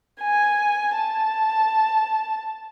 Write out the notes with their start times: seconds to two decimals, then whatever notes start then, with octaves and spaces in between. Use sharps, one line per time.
0.22 G#5
0.96 A5